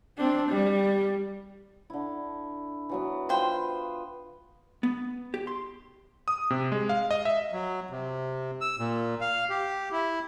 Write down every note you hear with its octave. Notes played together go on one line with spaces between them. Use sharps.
C4 D4
G3
D3 E4
E3 F#3 B3
F4 B4 C5 G5
B3
G4
C6
D#6
C3
G#3
F5
D#5
E5
F#3
C3
E6
A#2
F5
G4
E4